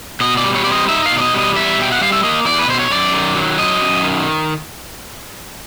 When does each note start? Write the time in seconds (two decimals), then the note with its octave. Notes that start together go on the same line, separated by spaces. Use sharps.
0.20 B2 D#5
0.37 D5
0.44 G3
0.55 C#5
0.64 C4 D5
0.72 D#5
0.88 D#4 E5
1.06 F5
1.11 B2
1.18 D5
1.22 D#5
1.34 G3 D#5
1.55 E2 E5
1.79 B2 G5
1.92 F#5
2.01 G3 F5
2.12 E5
2.23 A#3 D#5
2.45 E2 D5
2.59 B4
2.68 B2 C5
2.80 C#5
2.90 F#2 D5
3.13 D#3
3.35 F#3
3.58 F#2 D#5
3.81 F#2
4.03 D#3